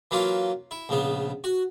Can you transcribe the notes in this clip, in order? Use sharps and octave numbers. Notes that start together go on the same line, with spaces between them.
E3 F#3 A#3 C#4 F4
E4
A#1 C#3 B3
F#4